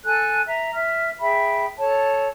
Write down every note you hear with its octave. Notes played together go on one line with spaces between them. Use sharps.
A4 G#5 A5 F#6
E5 A#5
E5 F6
G#4 E5 G5 B5
A4 C#5 A5